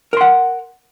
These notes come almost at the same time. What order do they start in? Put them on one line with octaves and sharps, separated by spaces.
A#4 C6 F#5